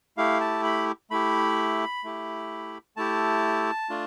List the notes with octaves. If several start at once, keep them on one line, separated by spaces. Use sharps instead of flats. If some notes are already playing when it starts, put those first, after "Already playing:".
A3 E4 G4 F5
A5
B5
A3 E4 G4 B5
A3 E4 G4
A3 E4 G4 A5
A3 D4 F4